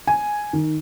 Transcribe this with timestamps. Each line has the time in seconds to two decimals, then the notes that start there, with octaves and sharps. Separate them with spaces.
0.07 G#5
0.53 D#3